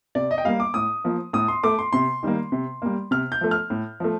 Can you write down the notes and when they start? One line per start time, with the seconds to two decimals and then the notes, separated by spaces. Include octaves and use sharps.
0.15 C3 D5
0.31 D#5
0.38 G5
0.45 G3 A#3 F5
0.60 D6
0.74 A2 D#6
1.04 F3 A#3
1.33 A2 D#6
1.48 C6
1.64 A3 D6
1.79 C6
1.93 C3 C6
2.23 D#3 G3 A#3
2.52 C3
2.82 G3 A#3
3.11 C3 F6
3.32 G6
3.41 F3 A3
3.51 F6
3.70 A2
4.00 F3 A3